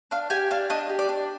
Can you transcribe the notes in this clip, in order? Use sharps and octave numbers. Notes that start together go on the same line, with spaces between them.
D4 F5
G4 G#5
D4 F5
D4 D#5
G4
D5
D4